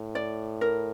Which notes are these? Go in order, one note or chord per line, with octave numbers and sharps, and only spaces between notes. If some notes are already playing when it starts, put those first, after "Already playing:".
Already playing: A2
D5
A#4